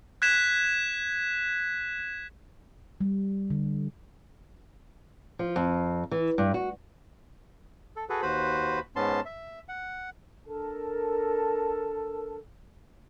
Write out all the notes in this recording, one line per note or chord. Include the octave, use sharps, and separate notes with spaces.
F#6 G#6 B6 E7
G3
D3
F3
F2
E3
G2
F#4
A4
F#4 G#4 A4 B4
D#2 F#4 B4 C5 B5
G#2 B3 C#4 A5 C6
E5
F#5
D4 A4 A#4 A5